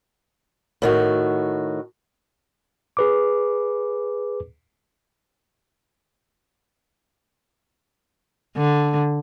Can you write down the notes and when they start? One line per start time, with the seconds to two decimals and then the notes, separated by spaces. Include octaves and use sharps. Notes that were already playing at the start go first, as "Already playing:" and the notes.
0.82 A2 D#3 F#4
2.97 G#4 B4 D6
8.56 D3